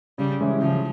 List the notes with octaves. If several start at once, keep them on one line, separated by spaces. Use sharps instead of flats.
C#3 G3
E3 G#3 C#4 E4
C#3 F3